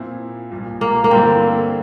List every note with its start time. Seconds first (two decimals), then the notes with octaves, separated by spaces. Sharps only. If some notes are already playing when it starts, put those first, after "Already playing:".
Already playing: A#2 F3 C4 E4
0.51 C2 A#2 F3
0.81 A#3
1.04 A#3
1.11 G2 D3 A3 C4 E4